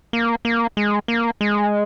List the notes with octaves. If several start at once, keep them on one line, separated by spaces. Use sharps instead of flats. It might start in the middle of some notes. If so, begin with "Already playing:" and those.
A#3
A#3
G#3
A#3
G#3